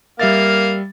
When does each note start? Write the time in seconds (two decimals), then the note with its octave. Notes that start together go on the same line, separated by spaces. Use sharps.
0.19 G3 A#3 E5 F5 A6